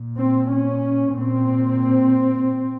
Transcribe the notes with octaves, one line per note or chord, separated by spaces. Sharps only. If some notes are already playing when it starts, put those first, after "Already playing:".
Already playing: A#2
C4
C#4
A#2 C4